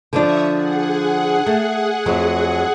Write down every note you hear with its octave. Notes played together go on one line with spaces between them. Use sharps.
D3 F3 D4 E5 C#6 D#6
G#4 F#5
A3
F2 F#3 A3